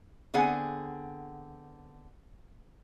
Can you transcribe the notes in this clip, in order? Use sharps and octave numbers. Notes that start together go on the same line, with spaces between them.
D3 B3 C4 G#4 F#5 G#5